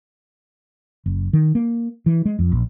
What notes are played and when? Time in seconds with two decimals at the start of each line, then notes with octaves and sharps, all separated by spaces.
1.06 F#1
1.33 D#3
1.55 A#3
2.06 E3
2.25 G#3
2.39 F2
2.52 A#1